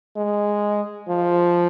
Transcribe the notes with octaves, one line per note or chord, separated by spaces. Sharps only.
G#3
F3